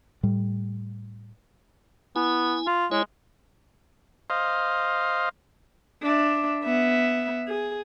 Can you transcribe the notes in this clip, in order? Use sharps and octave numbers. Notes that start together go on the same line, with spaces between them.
A2 G3
B3 E4 G#5
F4
G#3 E4 C#5
C5 D#5 F5
D4 E5
B3 E5
G#4